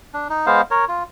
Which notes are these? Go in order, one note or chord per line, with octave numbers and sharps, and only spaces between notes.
D4
D#4
G#3 B3 C5 F5
A#4 C#5
F4